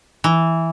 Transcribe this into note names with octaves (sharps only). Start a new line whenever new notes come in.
E3